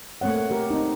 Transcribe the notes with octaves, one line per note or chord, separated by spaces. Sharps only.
A3 A#3 C4 C#5 F#5
G4 A#4
C4 D#4